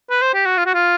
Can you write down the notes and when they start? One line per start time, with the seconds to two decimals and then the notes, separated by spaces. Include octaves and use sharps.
0.10 B4
0.22 C5
0.34 G4
0.46 F#4
0.58 F4
0.66 F#4
0.74 F4